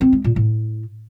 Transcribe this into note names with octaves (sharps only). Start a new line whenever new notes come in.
C4
G#3
A#2
A2